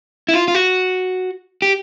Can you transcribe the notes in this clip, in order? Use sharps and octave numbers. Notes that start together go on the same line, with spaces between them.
E4
F4
F4
F#4
G4